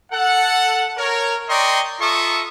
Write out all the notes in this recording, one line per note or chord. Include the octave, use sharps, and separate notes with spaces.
A4 F#5
A#4 C#5
D5 D#5 G5 A#5 C6 C#6
F4 A4 E5 A#5 C#6 D#6